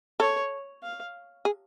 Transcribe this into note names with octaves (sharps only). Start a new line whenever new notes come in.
A4 C#5
F5
G#4